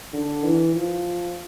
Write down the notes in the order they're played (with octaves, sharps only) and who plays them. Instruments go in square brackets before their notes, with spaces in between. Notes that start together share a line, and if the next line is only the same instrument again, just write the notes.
[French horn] D3
E3
F3